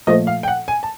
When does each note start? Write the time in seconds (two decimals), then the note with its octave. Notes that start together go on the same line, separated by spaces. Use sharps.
0.07 A#2 F3 A3 D#5
0.27 F5
0.43 G5
0.48 F#5
0.68 G#5
0.83 A5